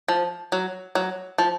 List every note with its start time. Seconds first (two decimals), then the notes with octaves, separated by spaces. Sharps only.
0.08 F3
0.52 F#3
0.95 F#3
1.38 F3